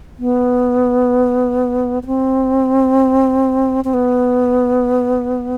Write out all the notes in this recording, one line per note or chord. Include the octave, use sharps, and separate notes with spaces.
B3
B3
C4
C4
B3